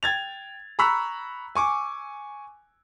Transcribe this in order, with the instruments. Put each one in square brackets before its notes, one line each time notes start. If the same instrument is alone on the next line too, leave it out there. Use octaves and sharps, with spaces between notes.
[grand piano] G5 G#6 A6 F7
A#5 B5 C#6 E6 F#6 B6
G#5 C#6 D6